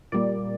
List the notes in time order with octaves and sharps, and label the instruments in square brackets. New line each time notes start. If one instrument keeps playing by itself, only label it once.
[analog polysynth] A#2 G3 A#3 D5